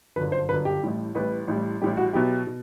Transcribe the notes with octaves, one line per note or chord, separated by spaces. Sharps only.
G1 F#2 D3 B4
C5
G1 F#2 D3 B4
G4
A1 A2 G3
A1 A2 G3 B4
A1 A2 G3
A1 A2 G3 G4
F#4
B2 F#3 B3 E4 G4
B2